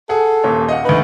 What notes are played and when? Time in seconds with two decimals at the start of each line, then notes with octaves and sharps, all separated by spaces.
0.09 G#4 A4 F#5
0.44 D#1 A#2 C#5
0.68 D#5 F5 F#5
0.85 D2 D#4 B4